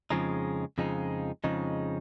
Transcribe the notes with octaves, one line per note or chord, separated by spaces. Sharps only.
F2 C#3 F3 G#3 D#4
F2 C#3 F3 G#3 D#4
F2 C#3 F3 G#3 D#4